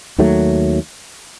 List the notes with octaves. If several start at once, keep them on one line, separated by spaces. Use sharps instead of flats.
D#2 D#3 F#3 A3